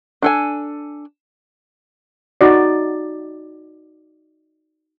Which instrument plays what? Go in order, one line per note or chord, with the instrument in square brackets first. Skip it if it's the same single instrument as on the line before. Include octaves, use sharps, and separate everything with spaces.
[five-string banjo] D4 A4 G#5
[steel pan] D#4 F#4 D5